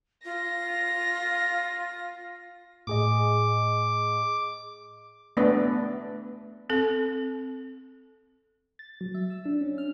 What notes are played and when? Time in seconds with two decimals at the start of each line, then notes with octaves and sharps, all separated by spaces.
0.25 F4 A#6
2.87 A2 G#4 D#5 D6
5.37 A3 B3 D4 B4 D5
6.70 C4 A4
8.79 A6
9.01 F#3
9.15 E5
9.30 E6
9.45 D4
9.61 C#4
9.78 F6